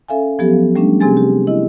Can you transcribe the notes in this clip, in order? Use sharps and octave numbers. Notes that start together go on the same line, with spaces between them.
C#4 A4 E5 F5 G#5
F3 F#3 B3 G4 A4
G3 A3 C#4 D4
C3 C4 G4 G#4 G#5 A6
G4
E4 D#5